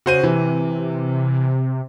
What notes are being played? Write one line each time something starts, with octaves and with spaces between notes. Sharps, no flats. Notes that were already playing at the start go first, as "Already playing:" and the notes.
C#3 F#4 C5 D#7
C3 E3